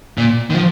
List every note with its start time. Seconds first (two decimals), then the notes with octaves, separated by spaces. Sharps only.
0.18 A#2
0.50 D#3
0.54 F3